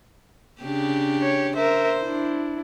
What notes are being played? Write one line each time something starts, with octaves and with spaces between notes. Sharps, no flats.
C#3 D4 G4
C#5
A#4 C5 E5
D4 E4